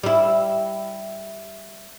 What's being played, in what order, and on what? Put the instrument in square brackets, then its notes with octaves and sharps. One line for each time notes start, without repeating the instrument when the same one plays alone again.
[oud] G3 E4